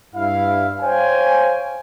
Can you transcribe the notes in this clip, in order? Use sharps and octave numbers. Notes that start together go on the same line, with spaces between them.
G2 E4 F5
C5 C#5 F5 G5 G#5